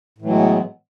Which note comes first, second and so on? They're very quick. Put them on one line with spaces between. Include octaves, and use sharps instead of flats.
A2 E3 F#3 G#3 B3